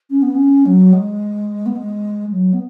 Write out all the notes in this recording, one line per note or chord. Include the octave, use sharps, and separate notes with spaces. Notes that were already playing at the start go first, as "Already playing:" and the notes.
C#4
B3
C#4
F#3
G#3
B3
G#3
F#3
B3